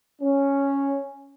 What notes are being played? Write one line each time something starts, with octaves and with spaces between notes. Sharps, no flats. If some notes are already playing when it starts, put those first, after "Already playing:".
C#4